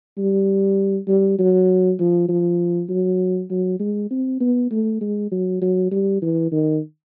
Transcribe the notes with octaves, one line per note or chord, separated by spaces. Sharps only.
G3
G3
F#3
F3
F3
F#3
F#3
G#3
C4
B3
A3
G#3
F#3
F#3
G3
E3
D#3